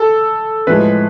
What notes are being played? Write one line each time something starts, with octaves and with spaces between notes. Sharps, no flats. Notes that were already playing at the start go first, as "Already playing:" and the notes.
Already playing: A4
A2 F3 G#3 B4